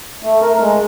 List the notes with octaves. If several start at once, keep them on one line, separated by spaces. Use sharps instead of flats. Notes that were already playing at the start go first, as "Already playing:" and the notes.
A3
A#4
G#3